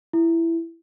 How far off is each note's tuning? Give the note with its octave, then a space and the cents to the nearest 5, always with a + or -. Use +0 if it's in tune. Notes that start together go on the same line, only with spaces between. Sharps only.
E4 +10